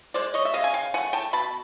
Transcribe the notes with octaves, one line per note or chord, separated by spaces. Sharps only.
G#3 C5 D5
C#5 D#5
E5
C#3 D#5 F5
G#5
F5 G5
A3 F#5 G#5
G5 A5
B2 A5 B5